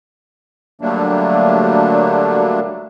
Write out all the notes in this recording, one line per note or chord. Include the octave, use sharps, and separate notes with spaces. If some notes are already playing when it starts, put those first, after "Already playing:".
D3 F#3 G3 A3 A#3 D4